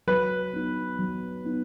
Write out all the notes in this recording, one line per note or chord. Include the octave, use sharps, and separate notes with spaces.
F#3 B4
B3 D#4
F#3
B3 D#4